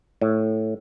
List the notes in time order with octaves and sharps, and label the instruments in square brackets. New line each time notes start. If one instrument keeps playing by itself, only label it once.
[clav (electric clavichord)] A2